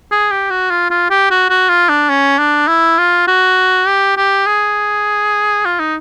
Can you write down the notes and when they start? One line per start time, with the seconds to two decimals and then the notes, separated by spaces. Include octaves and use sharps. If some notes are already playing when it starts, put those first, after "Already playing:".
0.11 G#4
0.31 G4
0.50 F#4
0.70 F4
0.90 F4
1.10 G4
1.30 F#4
1.49 F#4
1.69 F4
1.89 D4
2.09 C#4
2.38 D4
2.68 E4
2.98 F4
3.28 F#4
3.87 G4
4.17 G4
4.46 G#4
5.65 F4
5.80 D#4